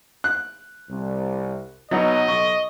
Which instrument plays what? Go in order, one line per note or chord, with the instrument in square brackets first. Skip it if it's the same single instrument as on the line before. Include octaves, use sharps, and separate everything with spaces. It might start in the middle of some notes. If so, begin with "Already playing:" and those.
[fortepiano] F#6
[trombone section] C2
[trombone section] B2 [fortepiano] F#3 D#4 [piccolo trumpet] D#5
[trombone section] B1 [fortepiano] C#6